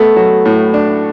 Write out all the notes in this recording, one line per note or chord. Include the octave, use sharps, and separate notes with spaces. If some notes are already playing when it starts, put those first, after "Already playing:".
Already playing: A3 B3
F#3
A2
D4